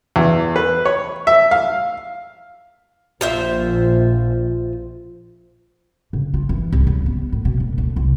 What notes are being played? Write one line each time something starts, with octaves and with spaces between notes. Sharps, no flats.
E2
B4
C#5
E5
F5
A#1 F4 C5 E5
C#3
F4
E3
C2
C#2
B3
A2
B2
F#1
D2
C2